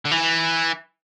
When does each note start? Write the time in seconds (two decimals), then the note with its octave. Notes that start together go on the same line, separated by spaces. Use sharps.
0.05 D3
0.11 E3